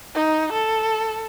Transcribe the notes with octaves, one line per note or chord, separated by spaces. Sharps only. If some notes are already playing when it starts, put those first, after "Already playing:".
D#4
A4